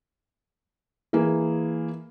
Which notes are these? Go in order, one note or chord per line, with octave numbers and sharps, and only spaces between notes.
E3 A#3 G#4